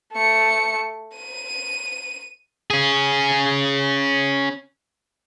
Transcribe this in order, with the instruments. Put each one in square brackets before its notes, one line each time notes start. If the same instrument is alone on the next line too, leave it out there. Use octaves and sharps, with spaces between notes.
[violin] A3 C#7
D#7
[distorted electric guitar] C#4 G#4